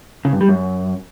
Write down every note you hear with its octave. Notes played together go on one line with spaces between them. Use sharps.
C#3
G2
G3
F#2